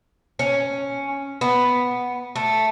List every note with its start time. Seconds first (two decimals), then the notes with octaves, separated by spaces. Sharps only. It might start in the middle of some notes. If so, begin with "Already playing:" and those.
0.39 C#4
1.41 B3
2.36 A3